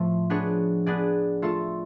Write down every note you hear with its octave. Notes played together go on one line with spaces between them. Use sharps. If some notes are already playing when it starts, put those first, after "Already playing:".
Already playing: A2 F3 A3 F4
B3 D4 G#4 C#5
B3 D4 G#4 D5
A3 F4 A4